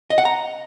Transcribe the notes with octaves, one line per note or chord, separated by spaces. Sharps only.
D#5
F#5
A#5